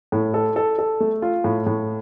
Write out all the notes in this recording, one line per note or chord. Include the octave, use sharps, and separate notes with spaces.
A2
A4
A4
A4
A3
F4
A2
A2